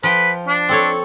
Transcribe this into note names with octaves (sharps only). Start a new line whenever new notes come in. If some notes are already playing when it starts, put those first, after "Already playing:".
F3 B4 G5
D4
C4 A4 C#5